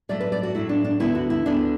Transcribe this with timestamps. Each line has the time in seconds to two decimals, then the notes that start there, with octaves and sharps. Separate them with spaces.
0.09 A2 F#3 A3 D5
0.20 B4
0.32 D5
0.43 F#4
0.54 A2 F#3 A3 E4
0.69 D4
0.84 D4
1.00 D2 D3 B3 E4
1.15 F#4
1.30 E4
1.46 D2 D3 B3 D4